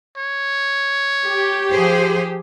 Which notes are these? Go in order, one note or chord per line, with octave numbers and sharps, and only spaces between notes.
C#5
G4
F3 G#4 C5